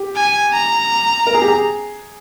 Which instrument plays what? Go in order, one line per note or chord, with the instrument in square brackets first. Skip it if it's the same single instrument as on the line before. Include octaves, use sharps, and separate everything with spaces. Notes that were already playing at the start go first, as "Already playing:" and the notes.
Already playing: [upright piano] G4
[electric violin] G#5
A#5
[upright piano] A#4
G#4
G4
G#4